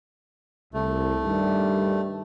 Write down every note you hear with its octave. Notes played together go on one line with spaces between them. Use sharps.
C2 A3
G2 D#3 G3